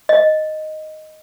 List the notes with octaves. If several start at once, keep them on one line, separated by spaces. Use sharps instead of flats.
D#5